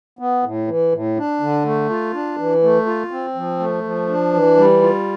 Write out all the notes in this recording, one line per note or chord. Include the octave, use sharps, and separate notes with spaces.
B3
A2
E3
A2
D4
D3
A3
F4
D4
E3
A3
F4
C4
F3
A3
F3
D4
E3
G3
F4